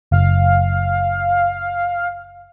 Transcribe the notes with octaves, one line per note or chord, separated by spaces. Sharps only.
F#1 F5